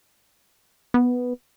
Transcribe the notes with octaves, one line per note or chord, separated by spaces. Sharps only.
B3